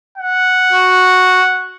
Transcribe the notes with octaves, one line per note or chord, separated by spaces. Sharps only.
F#5
F#4